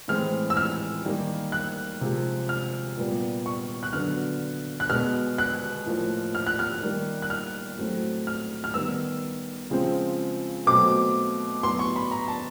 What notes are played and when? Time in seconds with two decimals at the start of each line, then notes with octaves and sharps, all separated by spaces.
0.08 A2 E3 G#3 C4 F6
0.50 E6
0.57 F6
1.05 D#3 G3 A#3
1.52 F#6
2.01 C3 F3 G#3
2.49 F6
2.97 A#2 G3 B3
3.46 C#6
3.83 F#6
3.93 D3 F#3 B3 F6
4.80 F#6
4.89 B2 G#3 B3 F6
5.38 F#6
5.86 A2 F3 A#3
6.35 F6
6.47 F#6
6.59 F6
6.82 D#3 G3 A#3
7.22 F#6
7.30 F6
7.78 A2 F#3 A3 C4
8.27 F6
8.64 F6
8.74 D#3 G3 B3 E6
9.70 C#3 F3 G#3 C4
10.67 B2 F#3 A3 C4 D6
11.63 A2 F#3 B3 C6
11.79 C#6
11.96 B5
12.11 A#5
12.28 A5